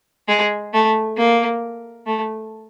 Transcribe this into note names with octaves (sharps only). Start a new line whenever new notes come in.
G#3
A3
A#3
A3